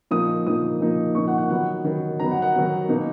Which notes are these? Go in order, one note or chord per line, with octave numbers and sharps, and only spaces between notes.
A#2 F3 A#3 D#4 D#6
A#2 F3 A#3 D#4 D#6
A#2 F3 A#3 D#4
A#2 F3 A#3 D#4 C#6
F#5
F#5
D#3 F#3 B3 F#5
D#3 F#3 B3
D#3 F#3 B3 A#5
F#5
F#5
D#3 F#3 B3
B2 A#3 D#4